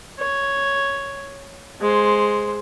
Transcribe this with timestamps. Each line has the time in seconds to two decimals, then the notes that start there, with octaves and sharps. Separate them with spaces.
0.19 C#5
1.81 G#3 C5